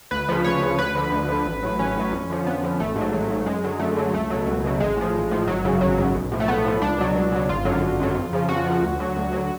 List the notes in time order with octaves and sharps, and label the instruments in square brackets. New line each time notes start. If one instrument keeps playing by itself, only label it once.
[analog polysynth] D2 B4
C#3 F3
D2 C#5
C#3 F3
D2 B4
D3 F3
D2
D3 F3
A1
A2 F#3
A1 C#4
A2 F#3
F2
D3 F3
F2 B3
D3 F3
A1 A3
G#2
F#3
A1 F#3
G#2 F#3
F#2 G#3
D3 F#3
F#2 A3
D3 F#3
C#2 A3
B2 F#3
C#2
B2 F#3
A1 G#3
A2 F3
A1
A2 F3
G#1 F#3
F#2 C#3
G#1 F#3
F#2 C#3
B1
A2 F3
A3
B1 B3
A2 F3
C#2 D4
B2 F#3
C#2
B2 F#3
G#1 F4
F#2 D3 F#3
G#1
F#2 D3 F#3
F2
C#3 F3
F2 F#4
C#3 F3
D2
D3 F#3
D2
D3 F#3